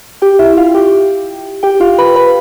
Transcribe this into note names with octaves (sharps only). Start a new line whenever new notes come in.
G4 G5
E4 E5
F4 F5
G4 G5
G4 G5
F4 F5
B4 B5
B4 B5